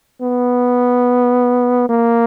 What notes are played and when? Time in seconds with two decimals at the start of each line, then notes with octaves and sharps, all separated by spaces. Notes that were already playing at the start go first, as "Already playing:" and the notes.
0.22 B3
1.89 A#3